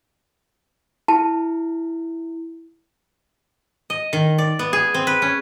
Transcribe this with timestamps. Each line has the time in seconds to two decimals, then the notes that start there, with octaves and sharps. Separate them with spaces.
1.08 E4 A5
3.90 D#5
4.13 D#3
4.38 D5
4.59 B3
4.73 G#4
4.94 C4
5.07 B4
5.22 C#4